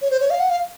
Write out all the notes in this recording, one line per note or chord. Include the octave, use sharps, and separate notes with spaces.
C#5
C5
C#5
F5
F#5
F5